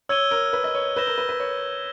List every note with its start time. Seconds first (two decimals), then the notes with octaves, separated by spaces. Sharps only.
0.09 C#5 E6 G#6 D#7 G7
0.31 A#4
0.53 B4
0.64 D#5
0.75 C#5
0.96 B4 E6 G6 A#6 E7 G7
1.07 A#4
1.18 B4
1.29 B4
1.40 C#5